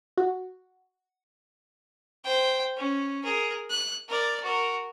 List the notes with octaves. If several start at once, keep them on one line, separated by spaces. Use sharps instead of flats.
F#4
C5 G5
C#4
G#4 A#4
F#6
A#4 D5
F#4 A#4